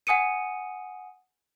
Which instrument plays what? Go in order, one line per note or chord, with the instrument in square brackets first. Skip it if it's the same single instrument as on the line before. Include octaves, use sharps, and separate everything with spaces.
[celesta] F#5 G#5 D#6 C#7 D#7